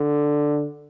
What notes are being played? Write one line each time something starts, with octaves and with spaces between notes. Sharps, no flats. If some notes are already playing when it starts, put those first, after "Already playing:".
Already playing: D3